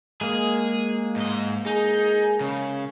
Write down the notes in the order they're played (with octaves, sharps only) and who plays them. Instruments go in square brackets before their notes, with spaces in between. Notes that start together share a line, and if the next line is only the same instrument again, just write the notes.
[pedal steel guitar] G#3 A#3 [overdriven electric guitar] G#4
[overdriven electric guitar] G#2 D#5
[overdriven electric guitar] D#4 [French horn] G#4
[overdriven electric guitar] C#3